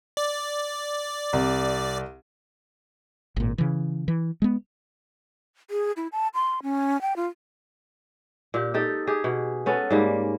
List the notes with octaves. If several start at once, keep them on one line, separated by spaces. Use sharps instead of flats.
D5
C2
G#1 A#2
C#3 E3
E3
G#3 B3
G#4
E4
A5
C6
C#4
G5
F4
A#2 G4
D#4 G4 A4
G4 G#4
B2
B3 C#4 A4
G#2 G3 A#3